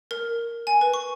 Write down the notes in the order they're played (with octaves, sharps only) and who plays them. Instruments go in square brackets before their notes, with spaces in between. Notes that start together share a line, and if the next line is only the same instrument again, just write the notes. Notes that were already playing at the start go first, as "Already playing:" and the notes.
[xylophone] A#4
G#5
B4
C#6